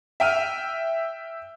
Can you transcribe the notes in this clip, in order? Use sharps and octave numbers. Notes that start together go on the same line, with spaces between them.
E5 G5 F6 D#7